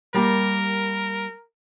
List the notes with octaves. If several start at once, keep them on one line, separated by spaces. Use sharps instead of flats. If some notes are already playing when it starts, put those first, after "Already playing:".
G3 A#3 G4 A#4